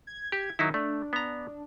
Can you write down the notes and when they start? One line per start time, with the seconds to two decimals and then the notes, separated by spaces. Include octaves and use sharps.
0.07 G#6
0.32 G4
0.59 D#3 F#3 D#4 E4
0.74 A3 D4
1.13 B3 A#5